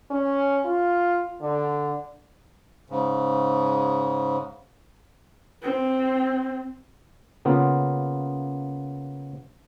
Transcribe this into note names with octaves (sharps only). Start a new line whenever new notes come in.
C#4
F4
D3
G#2 C#3
C4
C#3 A#3 B3 F4